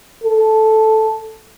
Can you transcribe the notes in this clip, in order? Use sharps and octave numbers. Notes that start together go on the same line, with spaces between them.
A4